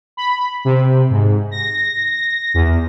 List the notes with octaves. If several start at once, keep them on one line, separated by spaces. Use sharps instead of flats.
B5
C3
G#2
A#6
E2